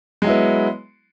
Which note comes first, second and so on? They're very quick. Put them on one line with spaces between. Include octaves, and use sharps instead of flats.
G#3 F#3 E4 B3